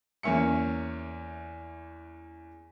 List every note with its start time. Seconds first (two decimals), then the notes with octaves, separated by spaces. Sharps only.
0.23 E2 A#3 C#4 E5 C#7